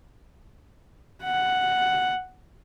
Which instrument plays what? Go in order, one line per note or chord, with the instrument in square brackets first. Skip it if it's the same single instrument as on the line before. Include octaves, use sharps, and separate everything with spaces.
[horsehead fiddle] F#5